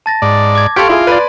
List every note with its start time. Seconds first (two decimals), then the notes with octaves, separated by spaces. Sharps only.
0.06 A5 A6 A#6
0.22 G#2 D5
0.55 D6 G#6
0.76 G4 A4 F5 C6 C#6 G#6 D7
0.89 E4 F4 G#4
1.07 B4 D5